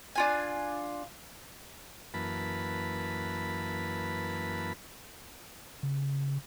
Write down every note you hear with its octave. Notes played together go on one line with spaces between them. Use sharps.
D4 F4 G#5
F#2 E3 A#3 B4 A5 B5
C#3